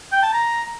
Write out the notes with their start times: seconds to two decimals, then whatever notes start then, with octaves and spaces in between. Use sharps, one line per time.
0.12 G5
0.23 A5
0.33 A#5